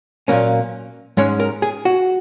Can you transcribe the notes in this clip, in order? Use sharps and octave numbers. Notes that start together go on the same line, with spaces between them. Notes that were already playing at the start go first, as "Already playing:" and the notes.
A#2 F#3 A#3 C#4
G#2 G#3 C#4 C#5
A#4
G#4
F#4